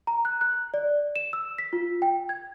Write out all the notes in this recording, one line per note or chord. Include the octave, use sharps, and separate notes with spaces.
A#5
F#6
F#6
D5
E7
E6
B6
F4
G5
G#6